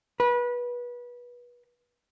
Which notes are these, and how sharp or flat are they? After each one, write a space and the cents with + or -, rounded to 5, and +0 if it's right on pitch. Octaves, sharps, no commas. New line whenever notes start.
B4 -25